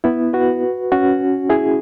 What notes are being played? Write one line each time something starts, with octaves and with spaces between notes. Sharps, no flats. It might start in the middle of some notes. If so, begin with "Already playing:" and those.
B3 E4
F#4 B4
C#4 F#4
E4 G#4